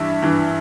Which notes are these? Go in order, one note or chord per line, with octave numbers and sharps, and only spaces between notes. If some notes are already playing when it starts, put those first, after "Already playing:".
Already playing: G2 E3 E5
G2 E3